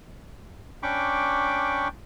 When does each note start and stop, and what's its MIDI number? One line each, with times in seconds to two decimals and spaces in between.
0.83 1.88 61
0.83 1.88 62
0.83 1.88 79
0.83 1.88 83
0.83 1.88 85
0.83 1.88 86